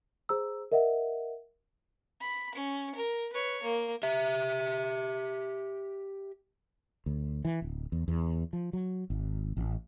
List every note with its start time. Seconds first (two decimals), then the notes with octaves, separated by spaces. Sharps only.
0.29 G#4 C5 A#5 E6
0.72 A#4 D#5 E5 F#5
2.21 B5
2.55 C#4
2.95 A#4
3.33 B4 C#5
3.63 A#3
4.03 G4 E5
7.06 D2
7.45 E3
7.62 D1
7.92 E2
8.08 E2
8.53 F3
8.73 F#3
9.10 G#1
9.57 A1